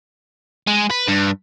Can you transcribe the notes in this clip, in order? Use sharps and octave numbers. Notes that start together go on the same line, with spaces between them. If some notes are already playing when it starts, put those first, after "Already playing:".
G#3
B4
G2